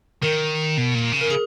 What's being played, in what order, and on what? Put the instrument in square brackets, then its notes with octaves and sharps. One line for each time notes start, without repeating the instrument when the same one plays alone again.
[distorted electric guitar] D#3 [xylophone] A#4
[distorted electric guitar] B2
A#2
C#3
[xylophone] A#4
G#4